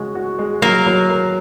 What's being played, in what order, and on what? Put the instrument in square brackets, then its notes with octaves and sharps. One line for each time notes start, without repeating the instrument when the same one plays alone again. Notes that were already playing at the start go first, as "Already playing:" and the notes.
Already playing: [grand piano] C#3 G#3 C#4 F#4
F#4
G#3
[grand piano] F#3 [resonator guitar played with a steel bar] A#3
[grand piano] F#3
A#4